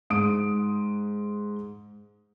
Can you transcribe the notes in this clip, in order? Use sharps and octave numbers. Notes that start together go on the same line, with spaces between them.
G#2 D#6 D7